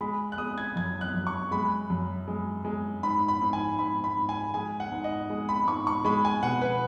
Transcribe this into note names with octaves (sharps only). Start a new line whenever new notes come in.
G#3 B5
F#6
G#3 D#6
G#6
F#2 G#6
F#6
F#2
C#6
G#3 B5
F#2
G#3
G#3
G#2 B5
B5
G#2
G#5
G#2 B5
B5
G#2
G#5
G#3 G#5
F#5
G#2
D#5
G#3
B5
G#2 C#6
C#6
G#3 B5
G#5
B2 F#5
B4